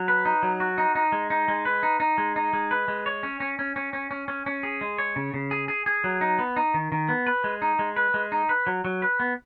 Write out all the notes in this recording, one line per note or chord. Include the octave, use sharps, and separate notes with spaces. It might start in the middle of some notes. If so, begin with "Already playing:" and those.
Already playing: F#3
B4
D#4
F#3
F#4
D#4
D#4
G#3
D#4
G#3
B4
D#4
D#4
G#3
D#4
G#3
B4
G#3
C#5
C#4
C#4
C#4
C#4
C#4
C#4
C#4
C#4
G#4
G#3
C#5
C#3
C#3
G#4
G#4
G#4
F#3
D#4
B3
D#4
D#3
D#3
B3
B4
G#3
D#4
G#3
B4
G#3
D#4
B4
F#3
F#3
B4
B3